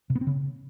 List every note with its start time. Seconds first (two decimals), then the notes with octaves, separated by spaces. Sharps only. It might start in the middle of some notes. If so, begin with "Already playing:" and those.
0.10 C3
0.15 B3
0.21 C4
0.27 C#3